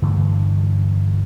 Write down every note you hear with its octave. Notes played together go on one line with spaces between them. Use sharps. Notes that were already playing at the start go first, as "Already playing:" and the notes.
G2 D3 E3 A3